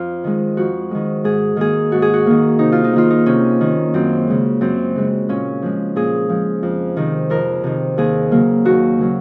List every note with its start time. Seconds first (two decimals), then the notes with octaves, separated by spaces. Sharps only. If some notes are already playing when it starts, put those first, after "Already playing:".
Already playing: F2 F4
0.24 D#3 G#3
0.57 F2 F#4
0.91 D#3 G#3
1.24 G#2 G#4
1.57 D#3 A#3 G#4
1.92 G#2 F#4
2.02 G#4
2.13 F#4
2.26 D#3 A#3
2.59 C3 D#4
2.72 F4
2.84 D#4
2.93 D#3 A#3 F4
3.10 D#4
3.26 C3 C#4
3.61 D#3 A#3
3.94 F#2 C4
4.27 C#3 G#3
4.61 F#2 C4
4.96 C#3 G#3
5.29 A#2 C#4
5.62 F3 G#3
5.96 A#2 G#4
6.29 F3 G#3
6.63 F2
6.96 C3 D#3
7.30 F2 A#4
7.63 C3 D#3
7.98 D#2 G#4
8.31 C#3 F#3 A#3
8.65 D#2 F#4
8.98 C#3 F#3 A#3